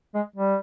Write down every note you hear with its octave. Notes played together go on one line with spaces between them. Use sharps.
G#3
G3